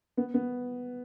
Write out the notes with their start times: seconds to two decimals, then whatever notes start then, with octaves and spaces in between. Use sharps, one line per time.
0.17 B3
0.34 B3